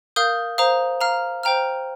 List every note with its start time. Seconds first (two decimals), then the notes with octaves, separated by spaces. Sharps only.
0.16 A#4 F5 D#6 G6
0.58 C5 F5 A#5 D#6
1.01 F5 A#5 F6
1.43 C5 G5 A#5 F6